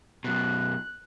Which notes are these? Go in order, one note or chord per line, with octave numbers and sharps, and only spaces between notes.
F#2 B2 F#6